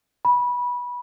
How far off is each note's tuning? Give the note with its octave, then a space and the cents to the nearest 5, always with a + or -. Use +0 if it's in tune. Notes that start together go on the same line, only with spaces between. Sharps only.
B5 -20